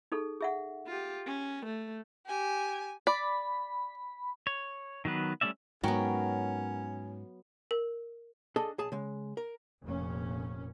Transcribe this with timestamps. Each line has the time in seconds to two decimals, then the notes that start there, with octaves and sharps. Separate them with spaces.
0.12 D#4 G#4 A4
0.41 G#4 E5 F#5
0.87 F4 G4
1.27 C#4
1.66 A3
2.26 G4 G#5
3.07 D5 B5
4.47 C#5
5.05 D#3 F#3 B3 B4
5.41 G3 A3 C#4 D5 E5
5.83 G#2 F#3 B3 C#4 A#4 C#5 G5
7.71 A#4
8.56 D4 G#4 A4 D#5
8.78 B1 G#4 A5
8.92 C#3 G#3
9.37 A#4
9.83 F1 A#2 C#4